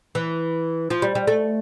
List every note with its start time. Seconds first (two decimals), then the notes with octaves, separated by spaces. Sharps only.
0.15 E3
0.90 F3
1.02 G3
1.15 G3
1.27 A3